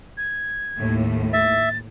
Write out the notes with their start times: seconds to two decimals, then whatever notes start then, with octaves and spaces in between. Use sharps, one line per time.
0.17 G#6
0.79 D#2 A2
1.33 E5 A6